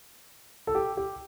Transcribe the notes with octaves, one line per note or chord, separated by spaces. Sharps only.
A4
G4
G4